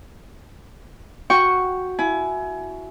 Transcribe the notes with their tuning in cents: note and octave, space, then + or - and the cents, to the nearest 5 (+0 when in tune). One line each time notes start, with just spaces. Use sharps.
F#4 -5 G5 +0 C#6 +0
E4 +0 G#5 +25